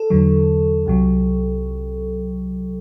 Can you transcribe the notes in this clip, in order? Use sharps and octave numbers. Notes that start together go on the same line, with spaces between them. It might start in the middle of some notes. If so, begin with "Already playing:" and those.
Already playing: A4
E2 D3 F#3
C2 C3 F#3